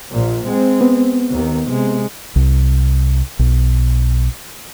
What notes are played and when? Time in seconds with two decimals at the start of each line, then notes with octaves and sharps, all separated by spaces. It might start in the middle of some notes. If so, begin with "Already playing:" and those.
0.10 A#1 A#2
0.47 G#3 C4
0.81 B3
1.30 D#2 D#3
1.69 C3 G#3
2.36 C2
3.39 B1